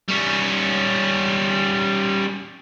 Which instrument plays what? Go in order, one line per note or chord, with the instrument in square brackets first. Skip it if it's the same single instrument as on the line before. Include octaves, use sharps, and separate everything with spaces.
[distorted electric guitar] G3 C#4